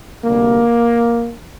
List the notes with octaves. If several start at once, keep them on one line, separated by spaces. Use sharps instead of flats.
D2 C3 G3 A#3